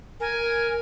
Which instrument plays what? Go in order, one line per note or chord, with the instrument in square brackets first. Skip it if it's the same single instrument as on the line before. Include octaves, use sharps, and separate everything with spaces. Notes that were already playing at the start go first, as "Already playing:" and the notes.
[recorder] A#4 [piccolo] G#5